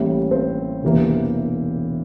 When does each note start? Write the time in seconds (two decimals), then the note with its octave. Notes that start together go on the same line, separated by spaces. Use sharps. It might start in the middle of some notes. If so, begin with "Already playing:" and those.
Already playing: A1 A2 G3 A#3
0.31 C4 C5
0.83 E1 C3 E3 A#3